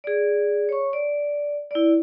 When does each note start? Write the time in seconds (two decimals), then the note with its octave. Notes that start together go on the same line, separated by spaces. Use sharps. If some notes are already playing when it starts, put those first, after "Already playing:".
0.04 G#4 D5
0.69 C#5 C#6
0.93 D5
1.71 E4 D5